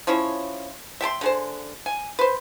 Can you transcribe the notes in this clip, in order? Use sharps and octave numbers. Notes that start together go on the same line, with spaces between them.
F3 C#4 E4 C#5
E5 G5 A5 C6
D3 G#4 C5
G#5
B4 C5